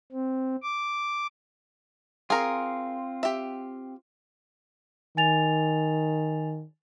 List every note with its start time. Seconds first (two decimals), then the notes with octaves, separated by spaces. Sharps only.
0.12 C4
0.62 D6
2.30 C4 F4 G#4 A#4
3.23 G4 E5
5.17 D#3 G#5 A6 F7